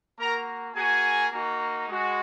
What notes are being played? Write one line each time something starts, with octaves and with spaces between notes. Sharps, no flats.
A#3 F#4 A#4 A#5
A#3 F#4 G#4 G#5
A#3 D#4 F#4
G#3 F#4